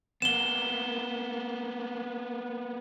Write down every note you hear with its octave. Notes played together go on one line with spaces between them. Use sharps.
A#3 B3 E7 G7